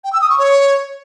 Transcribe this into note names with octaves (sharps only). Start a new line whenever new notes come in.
G5
E6
D#6
C#6
C#5